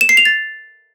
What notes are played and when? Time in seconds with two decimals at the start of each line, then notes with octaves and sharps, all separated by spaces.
0.01 E7
0.09 C7
0.17 F7
0.25 A6